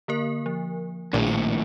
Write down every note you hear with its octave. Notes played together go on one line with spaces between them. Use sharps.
D3 A#3 A#4
F3
A#1 D#2 A2
C#7